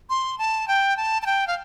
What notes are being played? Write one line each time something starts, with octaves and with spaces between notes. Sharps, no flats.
C6
A5
G5
A5
A5
G5
F5